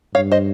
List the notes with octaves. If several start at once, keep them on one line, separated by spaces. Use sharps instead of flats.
G2 C#5 F5
C5 D#5